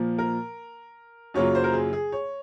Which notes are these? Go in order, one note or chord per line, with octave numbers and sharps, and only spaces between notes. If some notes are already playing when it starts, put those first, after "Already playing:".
Already playing: A#2 F3 A#3
A#4
F#2 C#3 F#3 A#3 F4 C#5
C5
A#4
G#4
G#4
C#5